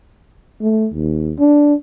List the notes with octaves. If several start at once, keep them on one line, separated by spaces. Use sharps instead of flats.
A3
D#2
D4